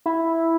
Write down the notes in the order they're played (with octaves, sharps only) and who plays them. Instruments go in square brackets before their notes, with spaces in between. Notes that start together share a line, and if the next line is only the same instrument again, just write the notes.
[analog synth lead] E4